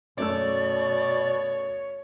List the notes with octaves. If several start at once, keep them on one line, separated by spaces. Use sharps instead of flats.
F#2 B2 A3 C#5 D5 E6